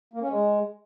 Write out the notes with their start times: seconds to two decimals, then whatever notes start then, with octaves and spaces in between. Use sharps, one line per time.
0.13 A#3
0.21 C#4
0.30 G#3